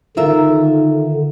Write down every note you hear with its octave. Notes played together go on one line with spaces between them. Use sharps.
D3 D#3 F4 A#4 E5